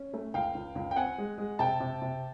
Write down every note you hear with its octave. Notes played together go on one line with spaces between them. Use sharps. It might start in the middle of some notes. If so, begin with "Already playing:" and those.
Already playing: C#4
A3
C#2 F5 G5
C#2
C#2
G5
C4 F#5 G#5
G#3
G#3
C3 G5 A5
C3
C3